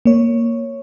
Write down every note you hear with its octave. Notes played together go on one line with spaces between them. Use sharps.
A#3 C#5